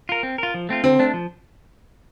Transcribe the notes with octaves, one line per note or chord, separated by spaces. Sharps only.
F4 A#4
C4
F4 A#4
F3
A3 C4 F4
D3 C4
A3 D4
F3